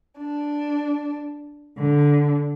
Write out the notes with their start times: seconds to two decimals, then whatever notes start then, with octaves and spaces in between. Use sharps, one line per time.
0.18 D4
1.77 D3